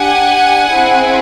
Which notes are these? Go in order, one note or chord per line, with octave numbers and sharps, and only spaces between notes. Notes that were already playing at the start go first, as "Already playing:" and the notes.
Already playing: D4 G4 F#5 G#5
C4 E4 G#4